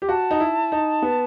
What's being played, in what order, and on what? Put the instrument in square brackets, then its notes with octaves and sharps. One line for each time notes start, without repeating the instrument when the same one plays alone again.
[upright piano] G4
[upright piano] F#4 [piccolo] A5
[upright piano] D#4
E4
D#4
B3